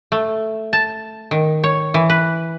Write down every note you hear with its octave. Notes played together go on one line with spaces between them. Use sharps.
A3
A5
D#3
C#5
E3
B4